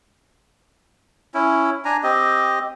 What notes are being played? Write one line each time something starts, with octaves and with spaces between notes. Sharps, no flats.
C#4 E4
D4 G#5 A#5
C4 G4 D#5